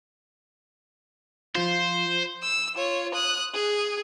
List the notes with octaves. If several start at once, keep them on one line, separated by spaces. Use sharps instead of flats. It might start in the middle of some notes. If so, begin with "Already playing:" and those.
F3 F4 C5
E6
F4 C#5
D#6 F#6
G#4